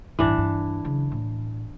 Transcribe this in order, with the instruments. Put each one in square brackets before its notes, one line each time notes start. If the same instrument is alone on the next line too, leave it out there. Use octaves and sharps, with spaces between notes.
[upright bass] A1 G2 [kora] E3 D4
[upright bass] G2
C#3 F#3
A2